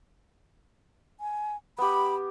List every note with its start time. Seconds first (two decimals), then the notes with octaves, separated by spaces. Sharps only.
1.20 G#5
1.78 B3 G4 B5